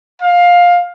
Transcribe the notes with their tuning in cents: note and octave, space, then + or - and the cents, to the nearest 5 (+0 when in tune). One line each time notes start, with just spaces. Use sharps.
F5 +15